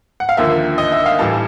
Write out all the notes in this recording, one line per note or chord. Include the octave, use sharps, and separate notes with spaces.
F#5
F5
D#2 D3 F3 A#3 E5
D#5
E5
F5
A2 E3 G3 A5